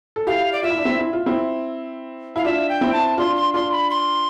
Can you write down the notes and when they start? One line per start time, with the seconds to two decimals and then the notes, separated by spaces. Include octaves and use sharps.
0.16 A4
0.27 E4 G4 F5
0.52 D5
0.63 F4 E5
0.70 E4
0.78 D4
0.85 C4 E4
1.00 E4
1.13 F4
1.26 C4 E4
2.36 E4 F5
2.44 D4 F4 E5
2.69 G5
2.81 C4 E4
2.93 A5
3.18 D4 F4 C6
3.36 C6
3.54 D4 F4 C6
3.72 B5
3.90 C6